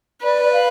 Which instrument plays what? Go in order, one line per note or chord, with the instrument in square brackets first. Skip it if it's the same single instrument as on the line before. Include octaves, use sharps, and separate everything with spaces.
[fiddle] B4 [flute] D5
[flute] D5
F5